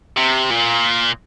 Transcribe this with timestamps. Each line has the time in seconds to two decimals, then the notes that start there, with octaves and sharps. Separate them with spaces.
0.17 C3
0.51 A#2